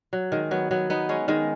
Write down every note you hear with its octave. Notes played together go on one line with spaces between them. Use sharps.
F#3
D#3 G#3
F#3 B3
F#3 B3
B3 D#4
G#3 C#4
D#3 G#3